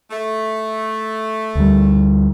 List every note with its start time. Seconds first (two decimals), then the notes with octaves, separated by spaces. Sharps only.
0.11 A3
1.55 D2 G3